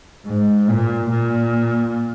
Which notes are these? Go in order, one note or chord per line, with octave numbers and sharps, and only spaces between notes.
G#2
A#2
A#2